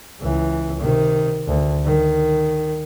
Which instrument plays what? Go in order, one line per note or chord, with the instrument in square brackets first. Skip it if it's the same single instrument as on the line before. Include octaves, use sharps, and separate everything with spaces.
[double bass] C#2 E3
C3 D#3
D2
D#3